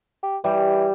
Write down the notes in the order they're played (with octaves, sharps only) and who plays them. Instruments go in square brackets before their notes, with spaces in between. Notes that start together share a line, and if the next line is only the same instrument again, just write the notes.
[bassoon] G4
[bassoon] E3 [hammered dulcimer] G3